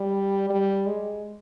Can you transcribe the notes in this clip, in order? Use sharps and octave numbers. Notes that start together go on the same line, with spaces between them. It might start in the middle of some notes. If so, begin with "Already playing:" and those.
Already playing: G3
G3
G#3